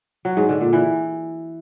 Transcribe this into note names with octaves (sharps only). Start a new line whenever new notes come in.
F#3
G#2
D3
A#2
E3